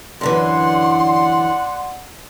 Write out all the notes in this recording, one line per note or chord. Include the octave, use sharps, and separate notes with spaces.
F#2 D3 E3 D5 F#5 C6